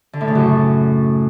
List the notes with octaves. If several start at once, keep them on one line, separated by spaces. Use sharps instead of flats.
D3
A2
C#3
F#2